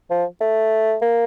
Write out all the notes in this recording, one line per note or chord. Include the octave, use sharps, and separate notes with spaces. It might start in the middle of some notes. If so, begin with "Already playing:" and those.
F3
A3
A#3